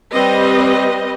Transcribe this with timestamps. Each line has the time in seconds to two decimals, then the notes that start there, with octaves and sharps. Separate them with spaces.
0.13 G3 C4 B4 D#5